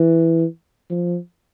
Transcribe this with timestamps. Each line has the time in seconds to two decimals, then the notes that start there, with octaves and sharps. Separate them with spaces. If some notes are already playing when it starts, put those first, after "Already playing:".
Already playing: E3
0.90 F3